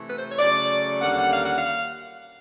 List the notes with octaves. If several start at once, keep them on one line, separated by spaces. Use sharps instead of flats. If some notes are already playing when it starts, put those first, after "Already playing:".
Already playing: C3 E3 A3
B4
C5
C#5
C#3 F#3 A3 D5
D#2 D3 G3 A#3 C#4 F#5
F#5
F5
F#5
F5